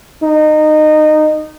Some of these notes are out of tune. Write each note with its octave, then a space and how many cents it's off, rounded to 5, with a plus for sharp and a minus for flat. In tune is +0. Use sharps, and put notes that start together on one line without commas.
D#4 -20